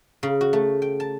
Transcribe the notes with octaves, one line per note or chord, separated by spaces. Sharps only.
C#3
F#4
A3
G5
A5